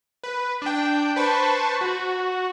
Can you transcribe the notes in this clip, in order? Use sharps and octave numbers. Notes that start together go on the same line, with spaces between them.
B4
D4 G5
B4 C5 A5 B5 C#6
F#4